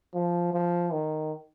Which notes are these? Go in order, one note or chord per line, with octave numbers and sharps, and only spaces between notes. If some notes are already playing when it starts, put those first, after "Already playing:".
F3
F3
D#3